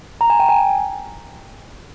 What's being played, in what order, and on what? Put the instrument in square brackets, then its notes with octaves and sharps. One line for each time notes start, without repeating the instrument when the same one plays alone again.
[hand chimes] A#5
G#5
G5
G#5